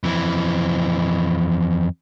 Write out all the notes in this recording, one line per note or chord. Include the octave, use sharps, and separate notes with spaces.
F2 E3